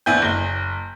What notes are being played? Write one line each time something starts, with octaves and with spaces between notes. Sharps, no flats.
A#1 B3 E4 G#5 G6
F#1 G7